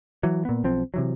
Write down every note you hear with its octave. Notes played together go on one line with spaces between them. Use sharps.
E3 F#3
A#2 B3
B1 F3 C4
C3 E3 F#3